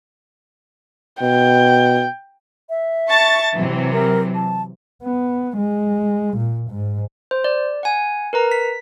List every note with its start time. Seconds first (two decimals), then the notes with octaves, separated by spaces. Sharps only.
1.21 B2 G5
2.69 E5
3.09 A5 C#6 A6
3.53 C3 E3 F#3
3.92 A#4
4.35 A5
5.03 B3
5.57 G#3
6.37 A#2
6.70 G#2
7.31 C5
7.44 D5
7.83 F#5 G#5
8.33 A#4 B4 A#5
8.52 B6